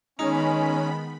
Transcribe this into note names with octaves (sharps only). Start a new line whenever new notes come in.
D#3 G#3 B3 C#4 D#4 B5